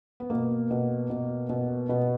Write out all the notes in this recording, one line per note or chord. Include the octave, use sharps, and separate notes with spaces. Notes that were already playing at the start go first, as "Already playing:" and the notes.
B3
B2 A#3
B2
B2
B2
B2 B3